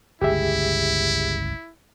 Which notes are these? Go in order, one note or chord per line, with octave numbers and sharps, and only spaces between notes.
G1 C#2 E4 G4 G#4 E5